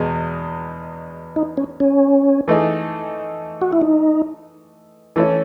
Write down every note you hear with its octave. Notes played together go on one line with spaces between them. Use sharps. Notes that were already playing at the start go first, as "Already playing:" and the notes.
Already playing: E2 B2 G#3
D#4
C#4
C#4
E3 A3 D#4 G#4
F#4
E4
D#4
E3 A3 C#4 E4